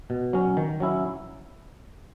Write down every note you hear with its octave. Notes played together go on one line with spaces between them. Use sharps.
B2
F#3 C#4
D#3
F#3 C#4 E4